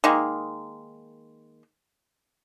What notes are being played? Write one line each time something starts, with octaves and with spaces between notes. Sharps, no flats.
D#3 G#3 A#3